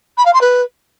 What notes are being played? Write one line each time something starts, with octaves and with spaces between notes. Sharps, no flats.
B5
F5
C6
B4